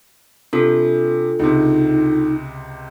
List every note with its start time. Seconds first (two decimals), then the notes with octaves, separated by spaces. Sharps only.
0.53 C3 D4 F4 A4
1.39 C#2 C3 D#4